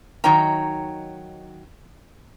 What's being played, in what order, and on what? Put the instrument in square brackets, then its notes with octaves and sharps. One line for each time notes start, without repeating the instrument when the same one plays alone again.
[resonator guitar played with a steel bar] D#3 F#3 D#4 C#5 G5 A#5